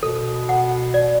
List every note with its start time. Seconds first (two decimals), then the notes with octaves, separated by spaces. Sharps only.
0.03 B2 A4
0.49 F#5
0.94 D5